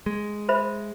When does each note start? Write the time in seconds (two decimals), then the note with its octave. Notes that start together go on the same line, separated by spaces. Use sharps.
0.06 G#3
0.49 C5 E5 B5